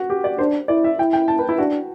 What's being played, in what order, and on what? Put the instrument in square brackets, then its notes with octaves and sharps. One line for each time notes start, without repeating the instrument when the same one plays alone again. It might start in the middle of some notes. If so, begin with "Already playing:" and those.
Already playing: [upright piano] F#4
G4
D5
[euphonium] D4 [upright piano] C5
[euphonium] E4 [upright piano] D5
[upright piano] E5
[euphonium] E4 [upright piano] G5
[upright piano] G5
A5
B4
E4
[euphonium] D4 [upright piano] F#4